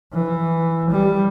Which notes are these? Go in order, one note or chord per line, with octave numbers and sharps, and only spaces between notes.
E3
G3